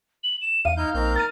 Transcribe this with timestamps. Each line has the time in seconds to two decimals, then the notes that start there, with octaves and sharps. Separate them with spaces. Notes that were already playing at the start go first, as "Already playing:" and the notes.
0.23 F#7
0.41 E7
0.65 E2 F5 D#7
0.77 D#4 E4 F6 G6
0.94 A#1 A#3 C4 D#4 G6
1.15 A#4 A#5 F6 A6 D#7